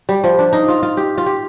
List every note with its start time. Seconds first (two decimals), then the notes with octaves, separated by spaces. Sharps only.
0.09 G3
0.24 F3
0.39 D4
0.53 D#4
0.68 F4
0.83 F4
0.97 G4
1.18 F4
1.26 G4